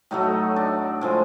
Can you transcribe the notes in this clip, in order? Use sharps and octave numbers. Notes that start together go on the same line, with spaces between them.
A2 F#3 A3 D#4
D4
A2 F3 G#3